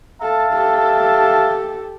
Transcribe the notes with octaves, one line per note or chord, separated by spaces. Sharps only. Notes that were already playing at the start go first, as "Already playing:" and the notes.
A4 E5 F5 A5
G4 A4